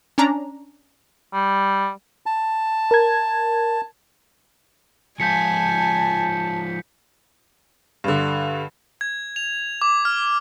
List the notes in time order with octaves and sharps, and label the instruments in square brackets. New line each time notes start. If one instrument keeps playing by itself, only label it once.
[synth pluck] C#4 D4 A#5
[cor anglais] G3
[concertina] A5
[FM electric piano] A#4 G#6
[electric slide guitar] F3 G#3 F4 [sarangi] G#5 [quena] A5 [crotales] G6 B6 C#7
[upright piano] G2 D3
[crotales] G#6
F7
D6
F6